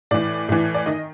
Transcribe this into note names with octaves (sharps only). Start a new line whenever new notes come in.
A2 E3 D5
A2 E3
D5
D#3 D#5